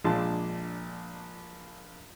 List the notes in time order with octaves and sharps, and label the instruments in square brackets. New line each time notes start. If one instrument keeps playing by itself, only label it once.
[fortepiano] A#1 A#2 G#3 D4 A5 C6